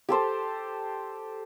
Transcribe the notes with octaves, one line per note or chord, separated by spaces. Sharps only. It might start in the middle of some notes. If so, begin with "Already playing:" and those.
G4 A4 C5